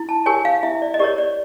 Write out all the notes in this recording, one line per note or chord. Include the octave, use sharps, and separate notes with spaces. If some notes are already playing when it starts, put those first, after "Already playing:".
Already playing: E4
A5
G4 A#4 C#5 G#5
F5
E4 E5
D5
D#5
G4 A#4 C#5 D5
D5